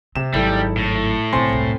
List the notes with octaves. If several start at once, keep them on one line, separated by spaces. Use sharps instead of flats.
C3 C4 E7
G#1 F#3 G3 E4 A4
A2
B1 C#3 C4 G#5 C6
E1 C2